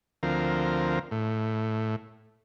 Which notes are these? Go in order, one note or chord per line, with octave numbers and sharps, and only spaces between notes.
D2 F3 C4 A#4
A2